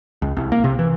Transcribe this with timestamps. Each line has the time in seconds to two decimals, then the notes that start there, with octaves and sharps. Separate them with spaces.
0.22 C#2
0.37 C2
0.52 A#3
0.64 C3
0.79 E3